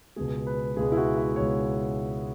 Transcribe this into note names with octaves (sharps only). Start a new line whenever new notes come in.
C#2 B2 G#3 G#4
B4
C#2 B2 G#3 G#4
E4
F#4
E5
C#2 B2 G#3 C#5